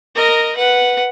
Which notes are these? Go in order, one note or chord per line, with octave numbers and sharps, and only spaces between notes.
A#4 D#5
B4 F#5